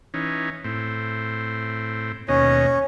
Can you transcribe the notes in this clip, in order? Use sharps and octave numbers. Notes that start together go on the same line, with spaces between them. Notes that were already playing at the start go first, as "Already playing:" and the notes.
E3 C#4 D#4
A2 C4
D#2 B2 C#4 C#5 D#5